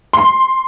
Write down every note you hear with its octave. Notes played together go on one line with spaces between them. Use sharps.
C6